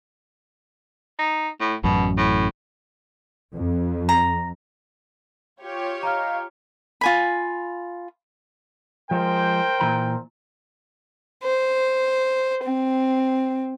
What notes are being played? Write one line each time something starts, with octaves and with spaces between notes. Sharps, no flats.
D#4
A2
A1 F#2 B2
A2
F2
A#5
F4 G4 C#5
D#5 F5 A#5 F6
F4 G#5 B5
F3 G#3 A#4 C5 G5
A#2 E3 A#5
C5
C4